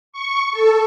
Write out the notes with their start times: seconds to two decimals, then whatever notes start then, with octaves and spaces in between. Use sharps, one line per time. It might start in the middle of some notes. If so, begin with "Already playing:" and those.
0.13 C#6
0.52 A4